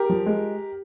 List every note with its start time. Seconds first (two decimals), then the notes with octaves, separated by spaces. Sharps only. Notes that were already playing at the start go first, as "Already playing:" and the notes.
Already playing: G4 A#4
0.09 F3
0.26 G#3